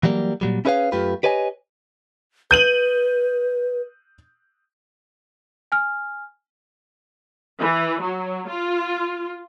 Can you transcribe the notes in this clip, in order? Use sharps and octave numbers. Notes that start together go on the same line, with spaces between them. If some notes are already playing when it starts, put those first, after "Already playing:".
E3 F#3 G3 A#3
A#2 F#3 G3
C#4 E4 G#4 B4 C#5 F5
F#2 A3 F4 G4 B4
G4 B4 C#5 D#5 G#5
B4 G6 D#7 F#7
G#5 F6
E3
F#3
F4